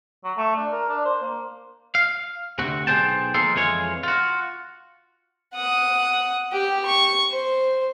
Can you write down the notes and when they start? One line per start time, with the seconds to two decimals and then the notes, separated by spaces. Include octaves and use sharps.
0.24 F#3
0.37 A3
0.56 D4
0.72 A#4
0.89 D4
1.05 C5
1.23 A#3
1.95 F5
2.59 D2 C3 F#4
2.87 B1 G3 G#4 C5 G5 A5
3.34 F3 G#3 A#3 A4 C6
3.55 F2 E3 G#3 F4 C#5
4.03 F4 F#4
5.55 F#5 D#6
6.52 G4 G5
6.86 C#6
7.31 C5